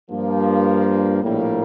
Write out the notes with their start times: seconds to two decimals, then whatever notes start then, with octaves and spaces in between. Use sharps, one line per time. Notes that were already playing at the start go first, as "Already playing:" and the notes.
0.10 G2 F3 A#3
1.23 A#1 A2 G3 A#3